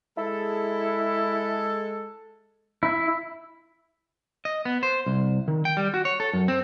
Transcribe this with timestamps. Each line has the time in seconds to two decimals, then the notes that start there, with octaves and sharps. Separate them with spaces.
0.18 G#3 E4 A4
2.83 E4
4.45 D#5
4.65 B3
4.83 C5
5.06 C2
5.48 D#3
5.65 G5
5.77 G3
5.94 F#4
6.05 C#5
6.20 A4
6.33 F#2
6.48 C4